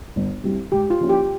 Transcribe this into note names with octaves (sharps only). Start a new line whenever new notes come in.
G1
G2 G3 C4 E4
G#2 G4
F4
F3 A#3 C#4 E4
G4